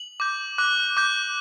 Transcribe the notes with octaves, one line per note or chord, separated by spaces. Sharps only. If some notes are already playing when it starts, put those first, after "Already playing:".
Already playing: F#7
D6 G6
D6 F#6
D6 G6